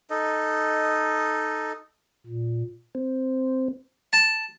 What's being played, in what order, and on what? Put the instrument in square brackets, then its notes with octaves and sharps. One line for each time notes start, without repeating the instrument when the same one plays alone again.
[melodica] D#4 A4 D#5
[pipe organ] A#2
[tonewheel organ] C4
[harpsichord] A5